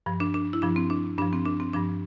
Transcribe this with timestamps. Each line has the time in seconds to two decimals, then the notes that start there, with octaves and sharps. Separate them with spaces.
0.06 G2 F3
0.20 D4
0.34 D4
0.53 E4
0.62 G2 F3 D4
0.76 C4
0.90 D4
1.17 G2 D4
1.22 F3
1.33 C4
1.46 D4
1.60 C4
1.73 G2 F3 D4